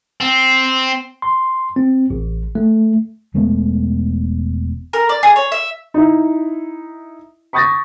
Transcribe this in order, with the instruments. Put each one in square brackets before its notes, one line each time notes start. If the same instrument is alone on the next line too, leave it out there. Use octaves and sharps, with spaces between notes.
[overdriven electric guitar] C4
[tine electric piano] C6
C4
A1
A3
[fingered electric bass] E1 G#3 A3 B3
[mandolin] A#4
D5
G#4
C#5
E5
[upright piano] D#4 E4
B5 C#6 D#6 G6 A6 A#6